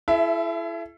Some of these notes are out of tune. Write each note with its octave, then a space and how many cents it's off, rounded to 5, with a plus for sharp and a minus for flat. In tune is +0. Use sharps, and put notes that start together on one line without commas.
E4 +30 A4 -40 E5 +0